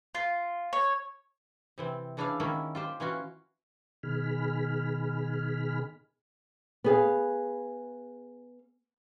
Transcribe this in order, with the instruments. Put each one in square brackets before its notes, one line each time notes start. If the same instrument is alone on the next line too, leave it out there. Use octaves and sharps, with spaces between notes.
[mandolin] F4
C#5
[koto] C3 E3 C4
C#3 E3 D4 E4 G#4 F5
D#3 A#3 C#4 E4
F4 G4 C5
E3 C#4 F4 F#4
[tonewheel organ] B2 D#3 G#4 B5 F6
[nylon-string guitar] B3 G#4 F5